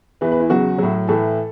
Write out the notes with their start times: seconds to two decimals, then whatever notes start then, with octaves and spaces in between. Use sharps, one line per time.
0.21 E2 E3 B4
0.32 B4
0.40 E4
0.50 E2 C#3 F#3 F#4
0.78 A2 F#3
1.08 A2 E3 A4